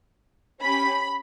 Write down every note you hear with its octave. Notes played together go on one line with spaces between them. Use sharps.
C#4 G4 B5